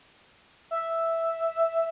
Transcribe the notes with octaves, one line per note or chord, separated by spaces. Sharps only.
E5